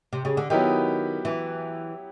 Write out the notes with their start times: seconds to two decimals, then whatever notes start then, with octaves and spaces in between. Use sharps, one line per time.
0.13 C3
0.25 C#3
0.37 D3
0.50 D#3 F#3 B3 E4 G4
1.25 E3